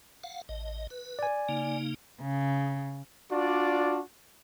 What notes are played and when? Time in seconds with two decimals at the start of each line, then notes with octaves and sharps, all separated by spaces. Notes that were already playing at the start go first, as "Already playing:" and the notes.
0.24 F5 F#5
0.49 A1 D#5
0.90 B4
1.19 D5 G#5
1.49 C#3 A#3 D#4
2.22 C#3
3.31 D4 F4 F#4 D5